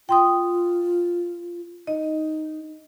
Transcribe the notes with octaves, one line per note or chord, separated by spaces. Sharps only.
F4 G5 C6 D#6
D#4 D#5